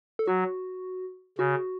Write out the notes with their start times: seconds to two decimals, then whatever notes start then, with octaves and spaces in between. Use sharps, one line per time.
0.19 A4
0.27 F#3 F#4
1.38 C#3 F#4